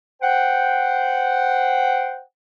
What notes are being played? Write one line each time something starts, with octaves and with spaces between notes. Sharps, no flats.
C5 F#5 G5